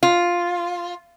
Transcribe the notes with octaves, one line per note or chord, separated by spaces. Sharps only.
F4